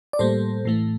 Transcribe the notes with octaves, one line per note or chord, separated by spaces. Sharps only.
D5
A2 G3 A#3 A4 C5
A2 E3 A3